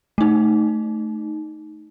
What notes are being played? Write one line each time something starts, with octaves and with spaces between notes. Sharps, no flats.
A3 D#4